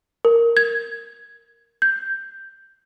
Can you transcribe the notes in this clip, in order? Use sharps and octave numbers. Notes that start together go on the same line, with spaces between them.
A#4
G#6
G6